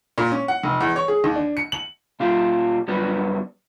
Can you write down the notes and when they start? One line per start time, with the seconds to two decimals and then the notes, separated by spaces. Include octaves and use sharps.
0.18 A#2
0.32 C#4
0.48 F#5
0.63 F1
0.80 E2
0.96 C#5
1.08 G#4
1.24 D#2
1.36 D4
1.57 C#7
1.72 F#7
2.20 A#2 F4 G4
2.88 F#2 F#3 G3 B3